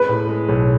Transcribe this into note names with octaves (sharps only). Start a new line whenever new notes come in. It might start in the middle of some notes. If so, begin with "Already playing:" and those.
Already playing: G#3 B4
A2
G#3
B1